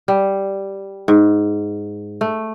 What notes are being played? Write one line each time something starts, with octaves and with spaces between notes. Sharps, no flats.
G3
G#2
A3